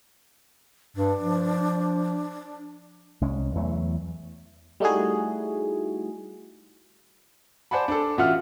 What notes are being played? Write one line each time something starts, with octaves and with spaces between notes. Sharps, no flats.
G2 D4
F3
C2 G#3 C#4
E2 E3 F#3 A3
G3 A3 D#4 E4 F#4 G#4
C5 D5 F#5 G#5 A5 B5
D4 A4
A1 F4 F#4 E5 F#5 F6